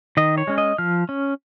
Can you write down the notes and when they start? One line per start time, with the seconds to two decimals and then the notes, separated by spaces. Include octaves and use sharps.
0.17 D#3 D#5
0.38 C#5
0.47 G#3 C#4
0.58 D#5
0.78 F3 F6
1.09 C#4